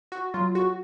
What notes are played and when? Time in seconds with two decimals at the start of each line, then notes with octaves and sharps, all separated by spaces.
0.12 F#4
0.34 F#3 F4
0.55 F#4